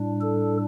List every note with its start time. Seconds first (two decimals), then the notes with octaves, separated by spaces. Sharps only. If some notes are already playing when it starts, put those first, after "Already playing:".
Already playing: A2 G3 D4
0.22 A4